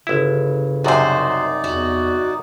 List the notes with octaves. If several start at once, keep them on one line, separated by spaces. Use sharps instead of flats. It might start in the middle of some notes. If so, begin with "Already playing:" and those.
G1 C#3 E4
C2 F#2 C3 D#4 F#4 C5 D5
E2 F#4